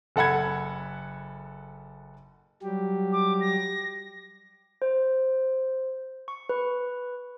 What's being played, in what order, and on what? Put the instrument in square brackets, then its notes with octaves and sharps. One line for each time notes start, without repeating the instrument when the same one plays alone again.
[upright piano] F#1 A4 F#5 B5 G#6
[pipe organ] F#3 G3 G4
[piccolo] D6
A#6
[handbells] C5
C#6
B4